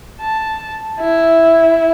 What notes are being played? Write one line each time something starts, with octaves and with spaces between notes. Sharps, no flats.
A5
E4